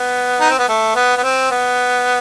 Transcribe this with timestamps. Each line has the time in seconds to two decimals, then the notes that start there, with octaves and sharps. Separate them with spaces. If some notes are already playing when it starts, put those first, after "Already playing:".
Already playing: B3
0.41 D#4
0.50 C4
0.59 B3
0.69 A3
0.95 B3
1.17 B3
1.24 C4
1.51 B3